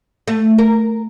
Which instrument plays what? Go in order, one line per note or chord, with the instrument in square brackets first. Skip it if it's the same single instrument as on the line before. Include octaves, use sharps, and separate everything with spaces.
[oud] A3
A#4